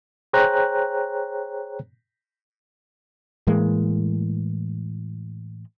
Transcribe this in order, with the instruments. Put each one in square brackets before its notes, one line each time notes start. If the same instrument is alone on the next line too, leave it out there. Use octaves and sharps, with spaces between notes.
[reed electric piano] G#4 C5 C#5 G5 A#5 F#6
[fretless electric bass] A2 E3 G#3 A#3